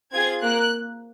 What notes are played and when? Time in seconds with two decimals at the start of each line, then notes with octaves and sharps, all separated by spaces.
0.12 C4 F4 G#4 G#6
0.42 A#3 F#6